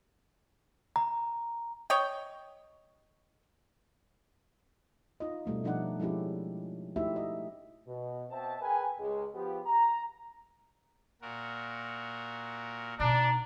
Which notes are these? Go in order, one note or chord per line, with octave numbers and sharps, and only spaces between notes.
A#5
C#5 D#5 G5
D#4 F4 D#5
B2 G3 A3 C4
B2 F3 D4 D#4 D5 F#5
F3 G#3 C#4 E4 G4
A3 D#4 E4 F#4 G4 E5
D#5
B2
B2 C4 E5 A5
G#4 A#4 B4 G5 G#5
C#2 G#3
F3 B3 F4 G4
A#5
A#2 F#4 A#4
B2 D4 D#4 A#5